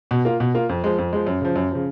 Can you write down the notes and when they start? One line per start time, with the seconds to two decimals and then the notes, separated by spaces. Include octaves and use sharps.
0.11 B2
0.25 A#3 F4
0.40 B2
0.55 A#3 F4
0.69 F2
0.84 F3 G#3
0.98 F2
1.13 F3 G#3
1.26 F#2
1.41 C#3 F3
1.56 F#2
1.71 C#3 F3